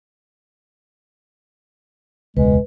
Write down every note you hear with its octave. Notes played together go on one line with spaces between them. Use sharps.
E1 C#2 G#3 B4